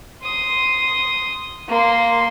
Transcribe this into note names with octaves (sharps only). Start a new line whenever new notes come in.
C6 D#6
A#3 C6